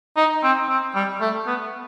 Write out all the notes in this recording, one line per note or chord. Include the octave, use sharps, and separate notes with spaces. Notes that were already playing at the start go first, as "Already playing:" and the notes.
D#4
C4
C4
G3
A3
B3